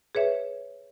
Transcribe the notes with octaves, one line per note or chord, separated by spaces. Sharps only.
G#4 B4 C#5 E5